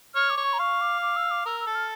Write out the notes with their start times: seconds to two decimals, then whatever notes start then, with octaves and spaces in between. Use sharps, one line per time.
0.15 C#5 F6
0.30 D6
0.37 C#5
0.44 C#6
0.53 A#5
0.59 F5 C#6
0.81 D6
1.02 D6
1.16 E6
1.31 D6
1.45 A#4 E6
1.60 E6
1.67 A4
1.75 F6